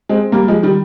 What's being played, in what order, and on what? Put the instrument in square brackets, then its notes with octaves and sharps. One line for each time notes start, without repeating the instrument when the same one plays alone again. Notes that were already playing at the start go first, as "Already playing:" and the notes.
[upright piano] G#3 C4
G3 A#3
F3 G#3
D#3 G3